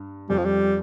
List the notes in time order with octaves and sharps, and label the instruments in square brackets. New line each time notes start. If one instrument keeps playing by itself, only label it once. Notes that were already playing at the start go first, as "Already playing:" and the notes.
Already playing: [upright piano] G2
[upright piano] F2 [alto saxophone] G3
[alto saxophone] F3
G3